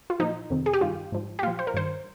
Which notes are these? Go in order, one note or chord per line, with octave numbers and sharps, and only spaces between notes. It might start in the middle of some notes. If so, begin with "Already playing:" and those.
F4
A#2 F3 D#4
F2 C3 D#3
G#4
G4
G2 D#3 F4
G#2 F3
G4
A#2 F3 F4
C5
A#4
G2 D#3 C5